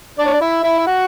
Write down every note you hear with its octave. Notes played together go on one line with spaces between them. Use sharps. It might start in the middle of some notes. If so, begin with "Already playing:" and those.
D4 D5
C#5
D5
E4 E5
E4 E5
E5
F#4 F#5